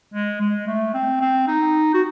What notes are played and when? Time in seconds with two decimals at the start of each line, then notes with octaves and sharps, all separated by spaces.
0.14 G#3
0.41 G#3
0.67 A3
0.94 C4
1.21 C4
1.47 D#4
1.94 F#4